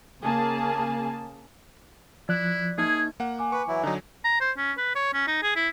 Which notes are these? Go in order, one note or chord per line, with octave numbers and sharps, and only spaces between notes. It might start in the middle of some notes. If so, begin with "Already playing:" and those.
C#3 A#3 G#4 A5
F3 E4 D5 F#6
A#3 D#4 G#4 C#5 G#6
A#3 F#5
G#5 D6
B4 C#6
E3 F#3 E4
D3 F#3 D#4
A#5
C5
C#4
B4
C#5
C#4
D#4
G#4
E4